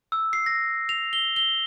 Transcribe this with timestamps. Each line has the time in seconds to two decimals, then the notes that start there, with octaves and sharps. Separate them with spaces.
0.12 E6
0.33 C7
0.46 A#6
0.89 F7
1.13 G7
1.36 G7